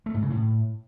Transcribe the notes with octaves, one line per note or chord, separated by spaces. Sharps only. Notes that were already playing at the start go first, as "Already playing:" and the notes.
A3
G#2
C#3
A2